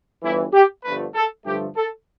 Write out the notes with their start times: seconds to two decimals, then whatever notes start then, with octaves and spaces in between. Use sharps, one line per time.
0.23 G1 G2 E3 E4
0.53 G4
0.84 G1 G2 D3 F3 A3 B4
1.15 A4
1.45 G2 D3 F3 A3 G4
1.77 A4